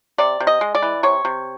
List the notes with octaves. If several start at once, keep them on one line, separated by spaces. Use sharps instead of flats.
C3 D5
C3
D#5
G#3
D5
E3
C3 C#5
C3